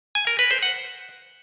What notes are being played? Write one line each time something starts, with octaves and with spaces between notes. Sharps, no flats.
G#5
A#4
B4
C5
F#5